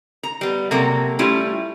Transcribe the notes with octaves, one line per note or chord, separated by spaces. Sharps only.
A#5
G3 B3
C3 F#3 A#3 A4 A#5
G3 A3 C#4 E4 F4